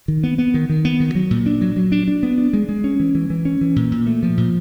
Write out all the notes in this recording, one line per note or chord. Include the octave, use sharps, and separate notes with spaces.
D#3
B3
B3
D#3
D#3
B3
D#3
F#3
A#2
D4
F#3
F#3
D4
D4
B3
D4
G#3
G#3
C#4
E3
E3
E3
C#4
E3
A#2
A#2
A3
F3
A#2